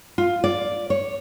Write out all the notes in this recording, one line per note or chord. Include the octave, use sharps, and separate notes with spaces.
F4
D5
C#5